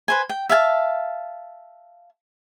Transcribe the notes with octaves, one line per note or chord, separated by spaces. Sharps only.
B4 C5 G#5
G5
E5 F5 G#5 A5